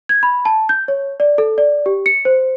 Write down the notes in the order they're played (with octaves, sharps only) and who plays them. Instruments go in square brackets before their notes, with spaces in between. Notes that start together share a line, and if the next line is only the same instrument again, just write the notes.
[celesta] G#6
B5
A5
G6
C#5
D5
A4
D5
G4
C#7
C5